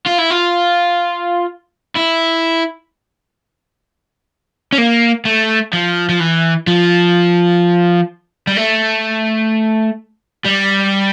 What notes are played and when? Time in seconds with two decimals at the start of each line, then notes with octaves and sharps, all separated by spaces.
0.06 F4
0.18 E4
0.30 F4
1.95 E4
4.73 C#4
4.78 A#3
5.25 A3
5.73 F3
6.09 F3
6.20 E3
6.67 F3
8.47 G3
8.57 A3
10.45 G3